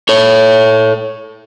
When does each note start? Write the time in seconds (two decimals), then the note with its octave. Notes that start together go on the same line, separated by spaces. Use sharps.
0.09 A4 C#5